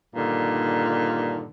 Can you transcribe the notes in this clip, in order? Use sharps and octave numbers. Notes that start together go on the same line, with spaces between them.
G2 A#2 D3 D#3